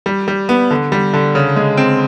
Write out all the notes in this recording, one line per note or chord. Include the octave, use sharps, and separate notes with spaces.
G3
G3
B3
D3
G3
D3
C#3
G#3
C4